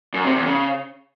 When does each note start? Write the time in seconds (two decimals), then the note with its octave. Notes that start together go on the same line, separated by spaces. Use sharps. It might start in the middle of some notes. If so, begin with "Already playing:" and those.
0.14 F#2
0.24 C3
0.35 E2
0.46 C#3